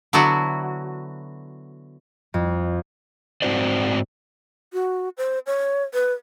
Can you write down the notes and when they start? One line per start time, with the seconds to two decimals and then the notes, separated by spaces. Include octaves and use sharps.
0.13 D3 F#3 B3 E4 F#4
2.34 F2
3.42 G#2 C4 F#4 C5 D5
4.73 F#4
5.18 C5
5.47 C#5
5.94 B4